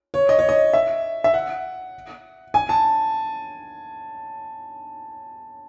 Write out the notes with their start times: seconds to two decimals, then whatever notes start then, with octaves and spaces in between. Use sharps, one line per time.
0.14 C#5
0.29 D#5
0.39 C#5
0.49 D#5
0.73 E5
1.24 E5
1.34 F#5
2.54 G#5
2.69 A5